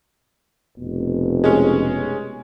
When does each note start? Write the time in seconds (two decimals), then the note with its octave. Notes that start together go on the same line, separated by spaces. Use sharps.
0.78 F1 B2
1.44 G#3 C#4